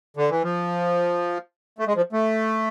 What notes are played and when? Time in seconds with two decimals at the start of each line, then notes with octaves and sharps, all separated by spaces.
0.17 D3
0.30 E3
0.43 F3
1.79 A3
1.87 G#3
1.96 F3
2.13 A3